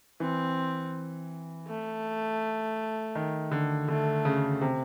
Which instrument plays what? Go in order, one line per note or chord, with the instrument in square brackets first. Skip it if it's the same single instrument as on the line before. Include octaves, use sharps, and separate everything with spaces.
[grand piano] E3 [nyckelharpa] C4
[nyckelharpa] A3
[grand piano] D#3
D3
[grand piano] D3 [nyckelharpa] A3
[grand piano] C#3
C3